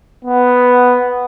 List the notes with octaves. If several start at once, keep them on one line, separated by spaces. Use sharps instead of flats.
B3